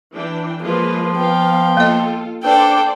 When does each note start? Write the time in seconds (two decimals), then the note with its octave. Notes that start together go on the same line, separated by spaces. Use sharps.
0.14 E3 D4 G5
0.62 F3 G#3 A#3 F4 B4
1.17 B3 F5 G5
1.77 A#3 F4 A4 D#5
2.44 D4 A4 B4 C5 D5 G5